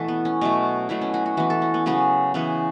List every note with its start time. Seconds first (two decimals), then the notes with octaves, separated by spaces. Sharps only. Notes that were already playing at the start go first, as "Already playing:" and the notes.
Already playing: B2 E3 A3 E4 F#4 A4
0.08 B3
0.25 C#4
0.41 B2 F#3 A3
0.89 B2 F#3 A3 E4
1.01 C#4
1.14 F#4
1.26 F#4
1.37 E3 B3 F#4
1.50 A4
1.62 C#4
1.74 B3
1.86 C#3 F#3 B3 C#4
2.34 C#3 E3 B3 C#4